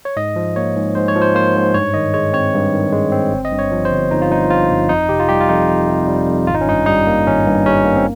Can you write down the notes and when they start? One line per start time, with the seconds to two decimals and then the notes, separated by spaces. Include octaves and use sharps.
0.05 C#5
0.17 G#2 D#5
0.36 F3
0.56 A#3 C#5
0.76 G#2
0.95 G#2 C5
1.08 C#5
1.16 F3
1.22 C5
1.35 A#3 C5
1.55 G#2
1.74 G2 C#5
1.94 D#3 D#5
2.14 G#3 C#5
2.33 C4 C#5
2.54 G2
2.73 D#3
2.92 G#3
3.12 C4
3.32 G1
3.45 D#5
3.52 G2
3.59 C#5
3.71 F3
3.85 C5
3.91 G1
4.11 G1 D#4
4.22 F4
4.30 G2 D#4
4.50 F3 F4
4.70 G1
4.89 F2 D#4
5.09 C3 G4
5.20 F4
5.29 G3 G4
5.41 F4
5.49 F2 D#4
5.69 F2
5.88 C3
6.08 G3
6.28 F2
6.47 G#1 F4
6.55 D#4
6.61 C#4
6.67 G2 D#4
6.86 G3 D#4
7.07 A#3
7.27 G#1 C#4
7.47 G2
7.66 G3 C#4
7.85 A#3
7.96 C4